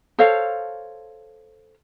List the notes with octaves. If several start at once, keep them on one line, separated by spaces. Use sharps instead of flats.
A4 C5 C#5 F5